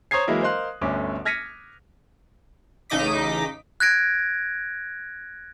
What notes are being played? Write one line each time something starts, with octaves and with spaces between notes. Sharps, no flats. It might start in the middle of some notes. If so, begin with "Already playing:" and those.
C5 C#5 A#5 D#6 G#6 C7
E3 F#3 G#3 A#3 E4
A#4 C5 D#5 F5 C6 F#6
G1 D2 D3 C#4 D6
F6 G#6 A#6 B6 C#7 D#7
A1 C#3 D#4 D#5 D6 B6
F#6 G#6 A#6 D7